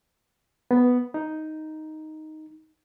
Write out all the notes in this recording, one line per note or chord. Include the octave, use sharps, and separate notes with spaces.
B3
D#4